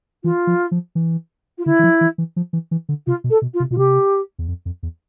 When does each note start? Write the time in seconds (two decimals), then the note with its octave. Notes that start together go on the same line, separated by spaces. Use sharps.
0.24 E3 F4
0.47 F3
0.71 F3
0.95 E3
1.58 F4
1.65 D3 E4
1.79 E3
1.84 F3
2.01 E3
2.18 E3
2.36 F3
2.53 E3
2.71 E3
2.89 D3
3.06 C3 F4
3.24 B2
3.30 A4
3.42 B2
3.54 F4
3.60 C3
3.70 B2 F4
3.77 C3 G4
4.39 E2
4.48 F2
4.65 F2
4.83 E2